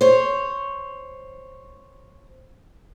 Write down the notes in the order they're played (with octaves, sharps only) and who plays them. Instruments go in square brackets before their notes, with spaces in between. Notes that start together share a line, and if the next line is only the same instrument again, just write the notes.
[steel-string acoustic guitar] C5 C#5